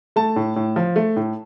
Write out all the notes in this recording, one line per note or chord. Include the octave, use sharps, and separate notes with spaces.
A3 A5
A2
A2
F3
A3
A2